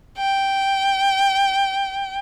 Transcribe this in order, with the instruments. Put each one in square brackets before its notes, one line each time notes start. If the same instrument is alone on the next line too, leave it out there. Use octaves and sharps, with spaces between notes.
[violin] G5